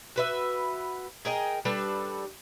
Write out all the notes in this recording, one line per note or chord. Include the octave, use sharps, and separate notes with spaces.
F#4 B4 E5
G#4 A#4 D#5 G5
G3 D4 A4 B4